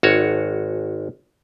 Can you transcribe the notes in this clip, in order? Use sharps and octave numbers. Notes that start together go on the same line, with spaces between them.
G#1 F#4 C#5